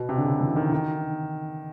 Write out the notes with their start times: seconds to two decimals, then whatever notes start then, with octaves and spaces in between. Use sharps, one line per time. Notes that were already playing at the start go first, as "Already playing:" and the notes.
Already playing: B2
0.09 C3
0.17 D3
0.25 C#3
0.41 E3
0.56 D#3
0.72 D#3